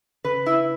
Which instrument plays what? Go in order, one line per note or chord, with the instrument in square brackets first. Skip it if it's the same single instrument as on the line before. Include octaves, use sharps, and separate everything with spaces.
[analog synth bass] C#3 [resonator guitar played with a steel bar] B4
[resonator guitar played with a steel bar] E4